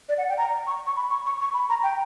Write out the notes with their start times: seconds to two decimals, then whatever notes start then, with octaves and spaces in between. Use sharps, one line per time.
0.09 D5
0.18 F#5
0.29 G5
0.38 A#5
0.67 C#6
0.87 C#6
0.97 B5
1.10 C#6
1.26 C#6
1.40 C#6
1.54 B5
1.70 A#5
1.83 G5